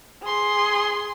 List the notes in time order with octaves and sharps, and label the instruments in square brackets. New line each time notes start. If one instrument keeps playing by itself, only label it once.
[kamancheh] G#4 C6